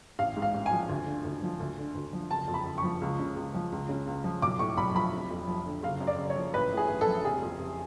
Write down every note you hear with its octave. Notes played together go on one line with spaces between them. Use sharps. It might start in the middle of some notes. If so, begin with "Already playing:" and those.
A1 F5
G#2
F5
A1
G#5
F3
D2
D3
D2
F3
D2
D3
D2
F3
F#1 A5
F2
B5
F#1
C#6
F3
C#2
C#3
C#2
F3
C#2
C#3
C#2
F3
B1 D6
A2 C#6
B1 B5
F3 B5
F1
F2
F3
D3
F#1 F5
F#2
D5
F#1
C#5
F3
A1 B4
A2
G#4
A1
A4
F3
F1 G#4
F2
F1